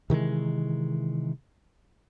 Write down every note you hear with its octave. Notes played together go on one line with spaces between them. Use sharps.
C3 D#3 E3 G#3